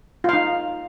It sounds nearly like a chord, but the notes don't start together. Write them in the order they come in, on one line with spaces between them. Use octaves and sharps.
F4 F5 D#4